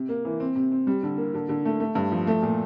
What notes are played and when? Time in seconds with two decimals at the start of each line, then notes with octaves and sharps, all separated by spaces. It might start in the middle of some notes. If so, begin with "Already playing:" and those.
Already playing: C3
0.09 A#3
0.25 E3
0.40 C4
0.55 C3
0.72 C4
0.87 G3
1.03 D3
1.18 A#3
1.34 D3
1.49 D3
1.65 A3
1.80 A3
1.95 G2
2.12 F3
2.27 A3
2.42 A#2